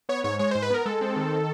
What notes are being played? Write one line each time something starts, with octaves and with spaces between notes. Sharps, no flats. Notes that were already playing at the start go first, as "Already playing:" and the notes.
B3 C#5
G#2 C#5
G#3 C#5
G#2 C5
B4
B3 A#4
G#3 A4
C4
D#3